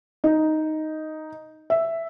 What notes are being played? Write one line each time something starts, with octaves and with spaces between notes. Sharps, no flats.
D#4
E5